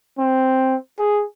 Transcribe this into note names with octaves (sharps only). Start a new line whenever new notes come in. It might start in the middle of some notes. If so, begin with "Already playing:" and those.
C4
G#4